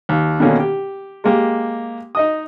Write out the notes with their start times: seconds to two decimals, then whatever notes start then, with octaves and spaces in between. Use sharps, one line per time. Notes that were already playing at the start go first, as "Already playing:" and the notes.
0.09 D#2
0.40 B2 D3 D#3 A#3 C#4
0.59 G4
1.24 G#3 A#3 G4
2.15 D#4 D#5 D#6